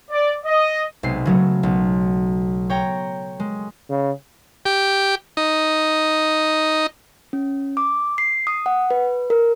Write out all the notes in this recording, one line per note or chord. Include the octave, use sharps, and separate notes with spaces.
D5
D#5
B1 C3 G#3 C7
C#3 F#3 A3
B1
C#5 G5 A#5
G#3
C#3
G4
D#4
C#4
D6
C7
D#6
F#5
B4
A#4